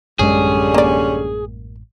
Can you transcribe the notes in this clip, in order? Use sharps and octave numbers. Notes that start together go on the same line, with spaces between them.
A1 F#2 D3 G3 G#3 C#4 G#4
A#3 D5